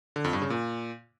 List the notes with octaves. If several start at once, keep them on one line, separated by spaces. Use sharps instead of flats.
D3
F2
G2
C#3
A#2